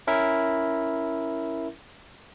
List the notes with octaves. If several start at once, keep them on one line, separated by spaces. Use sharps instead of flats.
C#4 E4 A#4 E5